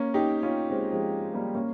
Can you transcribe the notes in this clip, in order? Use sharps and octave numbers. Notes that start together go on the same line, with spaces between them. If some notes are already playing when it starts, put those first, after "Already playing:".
Already playing: A#3 C#4
D#4 G4
C#4 F4
G#3 C4
F3 G#3
G3 A#3
A#3 C#4